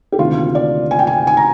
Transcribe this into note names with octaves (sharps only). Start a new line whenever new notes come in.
G4
D2 C3 D#3 A#3 F4
D5
G#5
G5
G#5
G#5
A#5